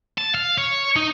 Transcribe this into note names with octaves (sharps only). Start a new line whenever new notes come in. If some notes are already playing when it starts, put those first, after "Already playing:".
A5
F5
C#5
D#4